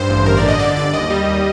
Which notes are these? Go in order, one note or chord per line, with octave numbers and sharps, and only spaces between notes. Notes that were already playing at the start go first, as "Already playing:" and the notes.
Already playing: G2 C5
A1
G1 A#4
D5
D3
D#5
D3 D5
G1 D5
D#2 D#5
G3
D#2